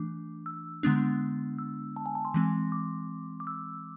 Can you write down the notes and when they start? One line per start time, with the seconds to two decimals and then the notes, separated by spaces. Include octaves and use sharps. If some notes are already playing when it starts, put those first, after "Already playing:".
Already playing: E3 A3 D4 D6
0.46 E6
0.83 D3 G#3 B3 D4
1.59 E6
1.96 A5
2.06 G#5
2.15 A5
2.25 C6
2.34 E3 G#3 C4
2.72 D6
3.40 D6
3.47 E6